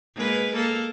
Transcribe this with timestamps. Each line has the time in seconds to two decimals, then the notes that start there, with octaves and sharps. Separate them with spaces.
0.15 G#3 A#3 B4
0.54 A#3 A4